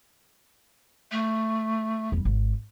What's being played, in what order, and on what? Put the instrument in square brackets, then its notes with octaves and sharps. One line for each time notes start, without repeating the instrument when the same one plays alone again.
[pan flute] A3
[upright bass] E2 G3
G#1